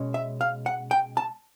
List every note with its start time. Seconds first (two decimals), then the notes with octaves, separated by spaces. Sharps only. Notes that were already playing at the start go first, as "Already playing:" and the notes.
Already playing: B2 G#3 C#4
0.14 E5
0.41 F5
0.66 F#5
0.91 G5
1.17 A5